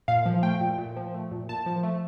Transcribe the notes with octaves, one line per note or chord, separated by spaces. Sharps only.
A#2 F5
F3
A3 G5
A#2
A#2
F3
A3
A#2
A#2 A5
F3
A3